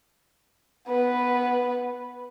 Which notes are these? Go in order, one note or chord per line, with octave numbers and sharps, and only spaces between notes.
B3 B4